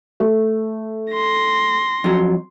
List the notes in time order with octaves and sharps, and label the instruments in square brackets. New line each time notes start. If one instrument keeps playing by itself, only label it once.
[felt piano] A3
[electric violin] C6 A#6
[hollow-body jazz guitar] F2 F#3